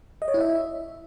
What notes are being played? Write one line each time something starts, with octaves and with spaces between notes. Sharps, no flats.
D#5
C#5
E4
E5